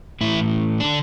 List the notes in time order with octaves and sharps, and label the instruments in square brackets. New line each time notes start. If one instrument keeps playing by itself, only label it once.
[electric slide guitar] A2 E3 E4
D3 D4